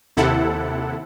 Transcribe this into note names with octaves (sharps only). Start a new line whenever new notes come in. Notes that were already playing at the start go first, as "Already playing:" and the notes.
D#2 C3 E4 A4 F#5